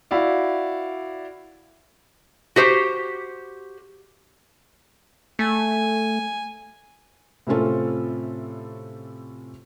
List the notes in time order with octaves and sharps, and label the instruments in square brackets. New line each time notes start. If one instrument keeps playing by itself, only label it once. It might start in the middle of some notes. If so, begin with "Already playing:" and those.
[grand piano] E4 F#4 D5 F5
[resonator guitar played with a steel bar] F#4 G4 C5
[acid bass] A3 [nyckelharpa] G#5
[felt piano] A2 C3 C4 C#4 F4 A4